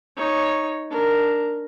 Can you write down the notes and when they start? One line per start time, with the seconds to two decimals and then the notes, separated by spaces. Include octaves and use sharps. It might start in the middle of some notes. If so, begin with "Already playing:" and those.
0.16 D#4 C#5
0.90 D4 A#4